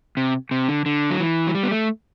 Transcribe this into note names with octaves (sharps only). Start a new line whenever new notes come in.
C3
C3
D3
D3
F#3
E3
F#3
G3
B3
A3